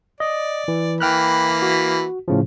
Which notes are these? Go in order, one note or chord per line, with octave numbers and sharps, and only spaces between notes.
D5 D#5
E3
E3 A#3 G5 B5 F6 F#6
F#4
A2 C#3 F3